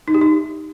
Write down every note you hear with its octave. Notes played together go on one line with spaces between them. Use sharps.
D#4
G4
D#4